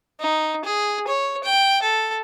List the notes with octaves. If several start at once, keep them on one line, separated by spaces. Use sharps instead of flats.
D#4
G#4
C#5
G5
A4